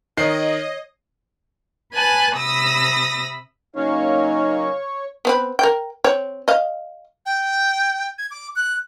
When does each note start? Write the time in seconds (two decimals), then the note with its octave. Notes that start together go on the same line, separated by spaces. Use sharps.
0.17 D#3 C#5 D#5 C7
1.93 B4 G#5 A5 F#6
2.35 C3 B5 D#6 E6 A#6
3.76 C#3 F#3 A#3 C#4 D#4 C#5 F5
5.25 B3 C4 B4
5.59 A#4 G5
6.04 C4 C#5
6.48 D#5 F5
7.26 G5
8.18 G#6
8.31 D6
8.56 F#6